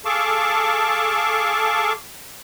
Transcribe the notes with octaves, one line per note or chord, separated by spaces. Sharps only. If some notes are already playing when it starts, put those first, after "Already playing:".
G#4 A4 F5 A5 C#6 D6